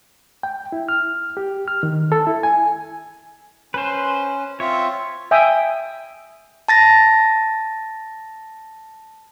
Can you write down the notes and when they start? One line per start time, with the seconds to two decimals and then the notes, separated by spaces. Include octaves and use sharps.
0.43 G5
0.72 E4
0.89 F6
1.37 G4
1.68 F6
1.83 D#3
2.12 A4
2.27 E4
2.43 G#5
3.74 C#4 B4 C5
4.60 C4 F4 C#5 E5
5.31 E5 G5 G#5 D#6
6.68 A5 A6 A#6